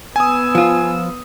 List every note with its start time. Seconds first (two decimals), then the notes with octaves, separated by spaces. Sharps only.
0.16 B3 G#5 D#6 E6
0.55 F3 F4